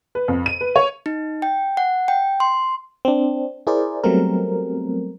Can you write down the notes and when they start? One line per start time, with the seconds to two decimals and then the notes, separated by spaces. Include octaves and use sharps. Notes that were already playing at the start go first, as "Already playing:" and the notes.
0.15 B4
0.28 F2
0.46 D#7
0.61 B4
0.76 C#5
1.06 D#4
1.42 G5
1.77 F#5
2.08 G5
2.40 C6
3.05 C4 D4
3.67 E4 G#4 A#4 C5 D5
4.04 F#3 G3 A3 B3 C4 A#4